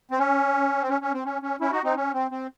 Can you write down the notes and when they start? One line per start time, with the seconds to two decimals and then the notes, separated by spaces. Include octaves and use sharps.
0.11 C4
0.19 C#4
0.82 C4
0.89 C#4
1.02 C#4
1.13 C4
1.25 C#4
1.42 C#4
1.60 C#4 E4
1.72 D#4 F#4
1.84 C4 D#4
1.96 C#4
2.13 C4
2.31 C4